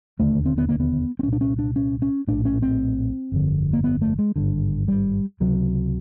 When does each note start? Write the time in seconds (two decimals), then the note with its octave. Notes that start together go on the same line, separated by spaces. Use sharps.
0.19 E1 D#2 D3 A3
0.46 C4
0.58 B3
0.69 A#3
0.80 B3
1.19 C4
1.23 C2 A#2 C#4
1.33 D4
1.41 C#4
1.59 D4
1.76 C#4
2.02 C#4
2.28 A#1 A2 D4
2.45 C#4
2.62 C4
3.32 G1 F2 D3
3.73 A#3
3.84 B3
4.01 A3
4.19 G#3
4.36 G#1 G2 D3
4.88 G3
5.40 C#2 C3 F#3